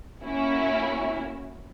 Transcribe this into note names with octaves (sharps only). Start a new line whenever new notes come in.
A#3 C#4 E4 F#4